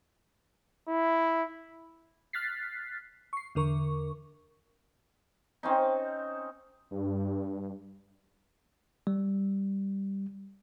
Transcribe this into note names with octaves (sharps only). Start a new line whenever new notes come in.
E4
F6 F#6 A6 B6 C7
C#6 C7
E2 D3 A#4 C#6
C4 C#4 D#4
G2
G3